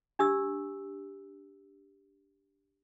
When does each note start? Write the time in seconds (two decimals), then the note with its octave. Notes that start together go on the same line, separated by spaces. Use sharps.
0.19 D4 G4 E6